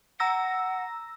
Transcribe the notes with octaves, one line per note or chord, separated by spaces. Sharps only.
F#5 A#5 E6 A#6